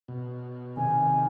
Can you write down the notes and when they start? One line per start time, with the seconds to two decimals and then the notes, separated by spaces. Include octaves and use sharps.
0.08 B2
0.77 C3 D#3 G#5